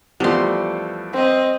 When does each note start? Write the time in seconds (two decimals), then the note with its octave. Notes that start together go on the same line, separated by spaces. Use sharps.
0.20 E2 F3 G3 A3 C6
1.13 C4 D#5